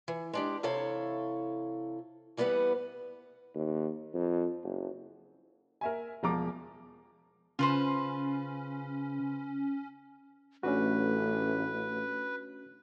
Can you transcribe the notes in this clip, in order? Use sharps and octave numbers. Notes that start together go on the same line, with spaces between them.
E3
G#3 D4 G4
C3 E3 E4 A4 C#5 F5
E3 G3 B3 G#4 B4 F#5
D#2
F2
F#1
A#4 E5 G#5
E1 F3 A#5 D6
C#3 C#4 F4 B4 C5
A1 A3 C#4 D4 F#4 B4